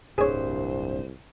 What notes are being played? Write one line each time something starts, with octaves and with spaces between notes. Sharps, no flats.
D1 C2 G2 G#4 C5 C#5